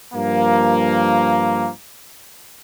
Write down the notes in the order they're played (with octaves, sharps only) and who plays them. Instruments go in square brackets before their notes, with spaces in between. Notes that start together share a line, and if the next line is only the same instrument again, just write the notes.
[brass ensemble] G2 F3 A#3